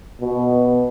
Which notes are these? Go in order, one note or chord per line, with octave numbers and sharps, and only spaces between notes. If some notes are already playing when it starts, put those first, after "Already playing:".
B2